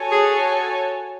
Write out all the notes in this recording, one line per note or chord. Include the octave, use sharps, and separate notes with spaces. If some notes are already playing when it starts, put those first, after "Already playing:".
Already playing: F#4 A4 C#5 G#5
G#4